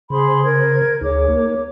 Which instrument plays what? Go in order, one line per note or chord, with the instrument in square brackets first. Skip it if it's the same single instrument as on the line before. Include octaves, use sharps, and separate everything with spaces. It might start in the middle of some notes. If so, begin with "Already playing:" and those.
[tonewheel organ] C#3 C5 [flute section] G#4 B5 C6
[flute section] A#4 G#6
[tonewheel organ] D2 D#4 G#4 [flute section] C#5 D6
[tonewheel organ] A#3 A#4